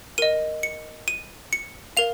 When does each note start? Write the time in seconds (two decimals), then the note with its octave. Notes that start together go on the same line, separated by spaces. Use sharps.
0.18 A#4 D#5 D#7
0.63 C#7
1.08 D#7
1.53 C#7
1.97 A#4 F5 F7